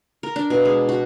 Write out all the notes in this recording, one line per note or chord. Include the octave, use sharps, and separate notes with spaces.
A#4
D4
B2
G#3
F#4